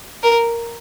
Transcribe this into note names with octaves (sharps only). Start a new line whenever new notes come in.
A#4